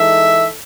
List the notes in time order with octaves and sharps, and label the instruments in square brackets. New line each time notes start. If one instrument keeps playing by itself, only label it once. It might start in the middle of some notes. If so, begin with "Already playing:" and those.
Already playing: [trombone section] E3 G#3 D#4 A4 [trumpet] E5